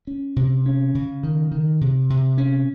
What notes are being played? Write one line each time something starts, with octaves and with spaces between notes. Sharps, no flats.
C#4
C3
C#4
C#3
D#3
D#3
C3
C3
C#4